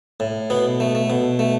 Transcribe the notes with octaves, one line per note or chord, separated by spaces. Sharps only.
A2
B2 B3
A3
A3
B2
A3